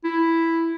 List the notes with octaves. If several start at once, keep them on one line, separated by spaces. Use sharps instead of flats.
E4